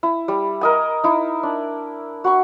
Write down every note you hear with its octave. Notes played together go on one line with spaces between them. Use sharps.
E4
G3
A#4 D#5 G#5
D#4 E4
D4
F#4 B5 C#6